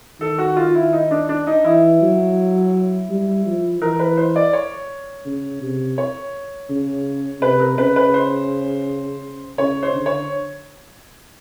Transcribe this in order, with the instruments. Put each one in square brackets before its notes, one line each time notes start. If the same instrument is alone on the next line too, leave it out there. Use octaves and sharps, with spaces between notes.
[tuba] D#3 [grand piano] A4
[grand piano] F#4
F4
E4
D#4
D4
D4
D#4
[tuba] E3 [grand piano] E4
[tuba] F#3
G3
F3
[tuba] E3 [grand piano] A#4
[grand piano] B4
C5
D5
C#5
[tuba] C#3
C3
[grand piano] C#5
[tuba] C#3
[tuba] C3 [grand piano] B4
[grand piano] A#4
[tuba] C#3 [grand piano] B4
[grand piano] B4
C5
[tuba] C#3 [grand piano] C#5
[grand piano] C5
[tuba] D3
[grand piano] C#5